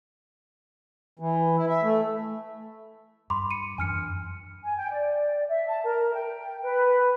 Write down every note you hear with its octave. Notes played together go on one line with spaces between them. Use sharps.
E3
E4
E5
A3
G2 B5 C6 D6
C#7 D#7
F#2 E3 D4 G#5 F6 C#7
G#5
G5
D5
E5
A5
A#4
G5
B4